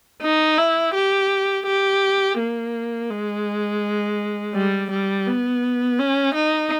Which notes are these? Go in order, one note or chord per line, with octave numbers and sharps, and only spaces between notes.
D#4
E4
G4
G4
A#3
G#3
G3
G3
B3
C#4
D#4